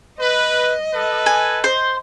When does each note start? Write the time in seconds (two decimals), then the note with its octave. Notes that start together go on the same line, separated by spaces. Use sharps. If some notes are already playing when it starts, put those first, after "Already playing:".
0.19 B4 D#5
0.94 A4 B4
1.26 G#5
1.64 C5